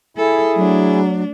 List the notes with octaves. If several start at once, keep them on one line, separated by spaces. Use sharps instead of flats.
E4 G#4 A4
F#3 A3 D4